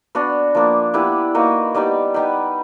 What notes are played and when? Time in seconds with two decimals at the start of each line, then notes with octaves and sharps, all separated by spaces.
0.15 B3 D4 F#4
0.55 F3 A#3 D4
0.94 B3 E4 G4 B4
1.35 A#3 D#4 F#4 B4
1.74 G3 B3 D#4 G4
2.14 B3 D#4 G4 B4